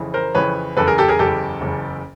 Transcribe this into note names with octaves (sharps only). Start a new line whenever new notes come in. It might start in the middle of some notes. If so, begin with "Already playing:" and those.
Already playing: F2 C#3 E3
A#4 C5
F2 C#3 E3 B4 C#5
F#1 E2 C#3 A4 B4
G#4 A#4
G4 A4
G#4 A#4
F#1 E2 C#3 G4 A4
F#1 E2 C#3